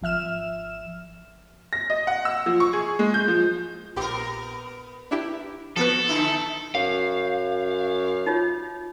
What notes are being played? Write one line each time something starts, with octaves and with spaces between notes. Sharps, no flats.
G#1 F3 E5 F6 E7
A#6
D#5
F#5
E6
F3
C#6
G#4
G#3
G6
F3
A#1 B3 G4 A#4
D4 E4 G4
F3 B3 F#4 A4 B4
D3 D#4 E4
F#2 F5
D#4 F4 C#5